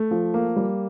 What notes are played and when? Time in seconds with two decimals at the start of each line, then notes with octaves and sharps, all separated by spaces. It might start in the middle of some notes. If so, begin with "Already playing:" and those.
Already playing: A3
0.11 F3
0.34 A#3
0.56 G3